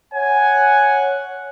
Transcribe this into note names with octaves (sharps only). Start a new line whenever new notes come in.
C#5 F#5 G#5